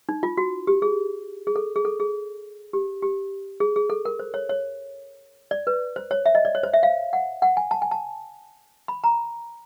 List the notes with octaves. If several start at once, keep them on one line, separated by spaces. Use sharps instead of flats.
D#4
F4
F#4
G4
G#4
G#4
A4
G#4
A4
G#4
G4
G4
G#4
G#4
A4
A#4
C5
C#5
C#5
D5
B4
C5
C#5
E5
D#5
D5
C#5
C5
E5
F5
F#5
F#5
G#5
A5
G#5
A5
B5
A#5